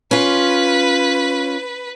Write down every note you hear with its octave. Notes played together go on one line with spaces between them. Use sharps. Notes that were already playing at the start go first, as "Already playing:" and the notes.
C#4 F4 B4